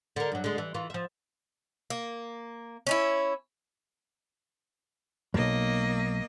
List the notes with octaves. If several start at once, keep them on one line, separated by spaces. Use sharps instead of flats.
D3 A#4
G2 F#3
D3 G#3
E3
E3 F4
F3 E5
A#3
C#4 D#4 E4
B1 F2 A#3 D#5